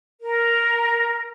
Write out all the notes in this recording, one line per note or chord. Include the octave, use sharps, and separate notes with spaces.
A#4